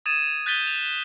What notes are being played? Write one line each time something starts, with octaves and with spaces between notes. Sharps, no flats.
D#6 G#6 A6 D#7 E7
F#6 G6 A6 B6 D#7 G7
F7